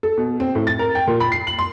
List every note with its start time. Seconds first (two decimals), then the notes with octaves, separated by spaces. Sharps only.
0.03 A4
0.18 B2
0.40 C4
0.55 A2
0.67 A6
0.79 A#4
0.95 G5
1.07 A#2
1.20 B5
1.32 C7
1.47 F#7
1.59 C6